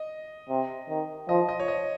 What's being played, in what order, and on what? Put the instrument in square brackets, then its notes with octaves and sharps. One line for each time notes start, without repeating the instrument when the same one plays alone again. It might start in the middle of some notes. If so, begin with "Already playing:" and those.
Already playing: [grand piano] D#5
[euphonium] C3
D#3
[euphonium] F3 [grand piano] D#5
[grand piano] D#5
C#5
D#5